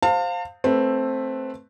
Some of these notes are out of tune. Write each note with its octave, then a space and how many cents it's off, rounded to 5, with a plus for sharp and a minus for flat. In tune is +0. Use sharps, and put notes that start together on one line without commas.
C5 +0 F5 +20 A5 +40
A3 +0 C4 +10 B4 +0